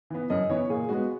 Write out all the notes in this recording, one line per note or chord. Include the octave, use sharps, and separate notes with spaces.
E3 B3
F#2 D#5
E3 B3 C#5
A#2 G#4
G#3 B3 F#4